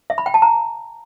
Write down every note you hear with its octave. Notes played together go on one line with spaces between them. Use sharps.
E5
B5
G5
A5
A#5